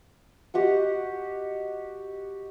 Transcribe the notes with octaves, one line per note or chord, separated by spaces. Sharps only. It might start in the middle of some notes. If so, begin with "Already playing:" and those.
F#4 G4 D#5 F#5